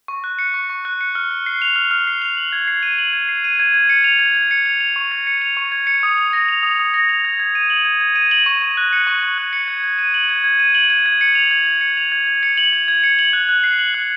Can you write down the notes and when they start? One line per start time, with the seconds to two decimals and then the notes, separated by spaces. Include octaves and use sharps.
0.08 C#6
0.24 F#6
0.39 C#7
0.54 C#6
0.70 C#6
0.85 F#6
1.01 C#7
1.15 F6
1.31 F6
1.46 C7
1.62 F7
1.76 F6
1.91 F6
2.07 C7
2.22 F7
2.37 F#7
2.53 G#6
2.68 C7
2.83 D#7
2.98 F#7
3.13 G#6
3.29 C7
3.44 D#7
3.60 G#6
3.74 G#6
3.89 C#7
4.04 F7
4.19 G#6
4.35 G#6
4.51 C#7
4.66 F7
4.80 F7
4.96 C#6
5.12 G#6
5.27 C#7
5.42 F7
5.57 C#6
5.72 G#6
5.87 C#7
6.03 D#6
6.18 D#6
6.33 A#6
6.49 F7
6.63 D#6
6.79 D#6
6.94 A#6
7.09 F7
7.25 G#6
7.39 G#6
7.55 D#7
7.70 F#7
7.85 G#6
8.01 G#6
8.16 D#7
8.31 F#7
8.46 C#6
8.62 C#6
8.77 F#6
8.93 C#7
9.07 C#6
9.23 C#6
9.38 F#6
9.53 C#7
9.68 G#6
9.84 G#6
9.99 D#7
10.14 F#7
10.29 G#6
10.44 G#6
10.59 D#7
10.75 F#7
10.90 G#6
11.06 G#6
11.21 C#7
11.35 F7
11.51 G#6
11.66 G#6
11.81 C#7
11.97 F7
12.12 G#6
12.27 G#6
12.43 C#7
12.57 F#7
12.73 G#6
12.88 G#6
13.03 C#7
13.19 F#7
13.33 F#6
13.49 F#6
13.64 C7
13.79 F#7
13.94 F#6